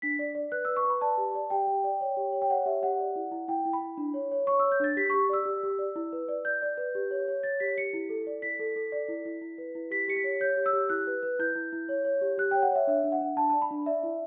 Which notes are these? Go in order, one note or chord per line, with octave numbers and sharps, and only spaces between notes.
D4 B6
D5
D5
B4 F#6
B4 E6
C#6
B4 B5
D5 A5
G4
D5
G4 G5
G4
D5
C#5
G4
C#5
G5
C#5 F#5
G4 E5
G4 F#5
D5
E4
E4
E4 G5
E4
B5
E4
D4
C#5
C#5
C#5 C#6
E6
C#5
G6
D4 A6
G4 B6
G4 C#6
D5 E6
G4
G4
D5
E4
B4
D5
D5 G6
D5
B4
G4
C#5
C#5
C#5 A6
G4 B6
G4 C#7
E4
A4
D5
E4 B6
A4
A4
D5
E4
E4
E4
B4
E4
G4 B6
G4 C#7
B6
C#5
C#5 G6
G4
E6
G4
E4 F#6
B4
B4
E4 G6
E4
E4
C#5
C#5
G4
G4 F#6
C#5 G5
F#5
C#5 E5
D4 E5
D4
F#5
D4
D4 A5
D5 A5
B5
D4
D5 E5
E4